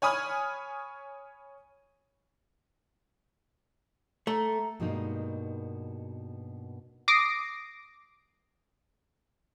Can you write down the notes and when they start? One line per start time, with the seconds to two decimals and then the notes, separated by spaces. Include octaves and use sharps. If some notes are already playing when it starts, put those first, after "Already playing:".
0.02 C#5 G#5 B5 D#6 F6
4.27 A3 A#5
4.80 G2 B2 F#3 G#3 A#3 D#4
7.08 D6 D#6 A#6 C7 D7